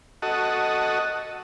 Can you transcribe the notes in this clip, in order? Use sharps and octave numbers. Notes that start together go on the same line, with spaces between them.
F#4 A4 D#5